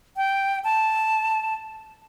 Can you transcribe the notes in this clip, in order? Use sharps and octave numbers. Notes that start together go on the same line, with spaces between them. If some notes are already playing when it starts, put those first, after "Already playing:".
G5
A5